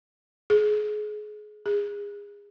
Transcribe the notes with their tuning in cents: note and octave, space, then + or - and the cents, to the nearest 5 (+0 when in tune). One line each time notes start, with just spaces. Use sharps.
G#4 +25
G#4 -25